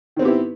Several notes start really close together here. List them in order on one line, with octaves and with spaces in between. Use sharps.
D#3 C4 B3 G4 E4